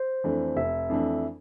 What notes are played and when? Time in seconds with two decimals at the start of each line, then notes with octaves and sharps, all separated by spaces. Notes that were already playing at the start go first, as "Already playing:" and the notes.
Already playing: C5
0.24 F2 E3 A3 D4
0.56 F1 E5
0.90 F2 E3 A3 D4